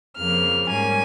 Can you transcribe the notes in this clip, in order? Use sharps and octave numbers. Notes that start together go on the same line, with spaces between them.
F2 C#3 F3 A#3 F6
G#2 G3 A#3 C#4 G#5